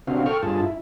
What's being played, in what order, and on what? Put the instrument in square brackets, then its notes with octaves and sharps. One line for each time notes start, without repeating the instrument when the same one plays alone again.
[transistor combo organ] C3 C4 D4 F#4 F5
A4 G5 C#6 F6
G2 F4 G#4 A5
E4